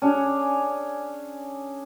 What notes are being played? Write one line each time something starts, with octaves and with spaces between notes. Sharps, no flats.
C#4 D4 G#4